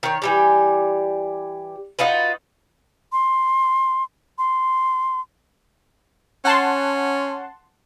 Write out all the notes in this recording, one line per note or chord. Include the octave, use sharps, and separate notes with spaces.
D#3 C#5
E3 G3 G4
D#4 F4 F#4 B4
C6
C6
C#4 F#5 A5 C6